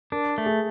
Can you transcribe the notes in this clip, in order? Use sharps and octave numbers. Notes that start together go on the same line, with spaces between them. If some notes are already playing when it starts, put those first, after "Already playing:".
D4 A#4
A3
G#4